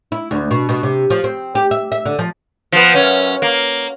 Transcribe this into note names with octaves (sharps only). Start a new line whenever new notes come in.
E4
D2
B2
B2
C3
F3
C4
G4
E5
E5
D3
F3
F3 B3
F#2 C#4
A#3